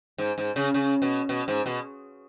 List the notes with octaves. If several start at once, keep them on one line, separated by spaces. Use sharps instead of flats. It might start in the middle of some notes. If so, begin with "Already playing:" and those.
G#2
G#2
C#3
C#3
B2
B2
G#2
B2